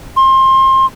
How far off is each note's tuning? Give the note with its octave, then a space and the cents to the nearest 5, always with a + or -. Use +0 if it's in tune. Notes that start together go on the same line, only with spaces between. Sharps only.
C6 +25